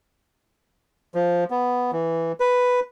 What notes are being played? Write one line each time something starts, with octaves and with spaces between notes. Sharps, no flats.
F3
B3
E3
B4